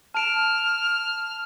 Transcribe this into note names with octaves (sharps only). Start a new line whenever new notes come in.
A5 F6 D7 E7